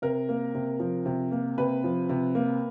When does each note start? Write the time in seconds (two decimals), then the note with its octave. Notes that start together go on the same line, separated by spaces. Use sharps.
0.02 C3 A#4
0.29 A#3
0.55 C3
0.80 F3
1.06 C3
1.31 A#3
1.58 C3 B4
1.84 F3
2.09 C3
2.35 A#3